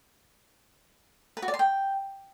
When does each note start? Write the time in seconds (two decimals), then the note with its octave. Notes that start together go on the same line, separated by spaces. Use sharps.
1.37 B4
1.42 F#4
1.48 D5
1.54 C6
1.59 G5